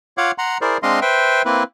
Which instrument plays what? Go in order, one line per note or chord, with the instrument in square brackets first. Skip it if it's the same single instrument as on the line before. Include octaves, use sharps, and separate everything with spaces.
[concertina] F4 C#5 F5 F#5 D6
F#5 A#5 C6
E4 G#4 A#4 C5 D5
G#3 C4 D4 D#5 F5 C6
B4 C5 E5 G5
A#3 C4 E4 B4